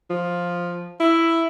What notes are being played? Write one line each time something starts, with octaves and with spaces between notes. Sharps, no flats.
F3
E4